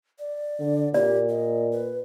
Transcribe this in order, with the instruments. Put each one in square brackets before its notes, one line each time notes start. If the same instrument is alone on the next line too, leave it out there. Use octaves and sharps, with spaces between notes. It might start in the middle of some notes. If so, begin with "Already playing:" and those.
[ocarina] D5
[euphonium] D3
[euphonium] A#2 [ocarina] G4 [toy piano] D5
[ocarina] D#5
B4